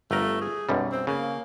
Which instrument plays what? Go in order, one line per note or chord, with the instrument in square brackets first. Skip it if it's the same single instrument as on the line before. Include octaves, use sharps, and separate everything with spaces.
[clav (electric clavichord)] G1 A#4 [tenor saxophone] A3
[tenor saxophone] G#4
[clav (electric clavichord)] B1 F#2 G3
[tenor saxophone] C4
[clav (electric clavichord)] C#3 [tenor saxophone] A#3